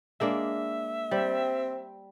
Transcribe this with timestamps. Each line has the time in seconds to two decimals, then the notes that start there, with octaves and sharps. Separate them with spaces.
0.21 G#3 A#3 D4 E5
1.11 G3 C4